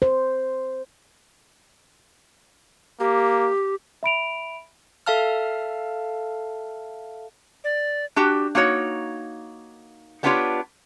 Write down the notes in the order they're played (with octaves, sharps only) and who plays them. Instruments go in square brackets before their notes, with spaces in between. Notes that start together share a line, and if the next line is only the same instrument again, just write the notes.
[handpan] C5
[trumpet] A#3 [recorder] G4
[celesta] E5 B5 D7 F7
[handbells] A4 E5 F5 A5 F6
[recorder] D5
[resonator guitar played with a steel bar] D4 F#4 G4
A#3 D#4 F#4 C#5
G3 B3 D4 F4 G4 C#5